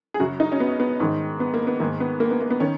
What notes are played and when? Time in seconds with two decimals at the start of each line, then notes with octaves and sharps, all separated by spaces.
0.14 G#4
0.20 F#2 C#3 F#4
0.40 D#4
0.52 C#4
0.60 B3
0.80 B3
1.00 G#2 D#3
1.40 B3
1.54 A#3
1.67 B3
1.80 G#2 D#3 A#3
2.00 B3
2.20 A#3
2.31 B3
2.40 A#3
2.50 B3
2.60 D#3 C#4